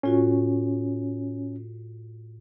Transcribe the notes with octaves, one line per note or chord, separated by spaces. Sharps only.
A2 C#4 F4 F#4